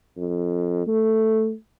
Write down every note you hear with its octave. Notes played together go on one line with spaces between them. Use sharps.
F2
A3